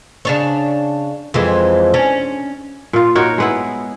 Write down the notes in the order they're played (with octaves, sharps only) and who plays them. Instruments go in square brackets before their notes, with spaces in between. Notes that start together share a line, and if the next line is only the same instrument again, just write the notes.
[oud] C#3 D4 C#5
F2 E3 G#3
C#4 D4
[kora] A#2 F4
D#4 F#4 A#4 C#5
G#3 B3 E4